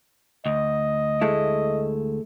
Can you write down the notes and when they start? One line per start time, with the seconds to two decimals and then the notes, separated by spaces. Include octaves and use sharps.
0.46 D2 D#5
1.21 G#3 A3 E4